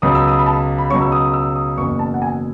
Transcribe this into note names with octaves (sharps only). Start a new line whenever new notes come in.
C#2 B2 F#3 C#4 D#6
E6
D#6
B5
A5
B5
C#2 B2 F#3 C#4 C#6
E6
D#6
E6
D#6
F#1 E2 B2 C#6
A5
F#5
G#5